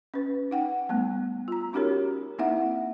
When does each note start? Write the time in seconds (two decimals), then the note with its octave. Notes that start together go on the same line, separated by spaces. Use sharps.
0.14 C#4 B4
0.51 D#4 F#5 G5
0.89 G3 A3 B3
1.48 F4 A#5
1.73 C#4 D#4 F#4 G4 A#4 C#5
2.39 A#3 C4 D#4 E4 E5 F#5